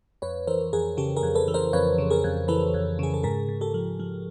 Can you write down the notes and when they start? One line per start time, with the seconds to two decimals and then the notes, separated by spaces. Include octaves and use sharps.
0.22 F2 B4 C#5
0.47 E3 A#4 C5
0.73 F2 G#4 A#4
0.97 C#3 G4 A4
1.16 G#4 A#4
1.23 F2
1.35 A4 B4
1.48 E3
1.54 A#4 C5
1.73 F2 B4 C#5
1.98 C#3
2.10 G#4 A#4
2.24 F2
2.48 E3 A4 B4
2.74 F2
2.99 C#3 G#4
3.14 A4
3.23 G#2 G#4 A#4
3.49 G#2
3.61 G4 A4
3.74 F3
4.00 F3